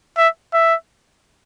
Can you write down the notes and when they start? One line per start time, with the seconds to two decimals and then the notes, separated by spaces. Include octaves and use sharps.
0.17 E5
0.53 E5